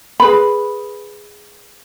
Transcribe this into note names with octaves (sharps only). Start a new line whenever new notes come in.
G#4 B4 B5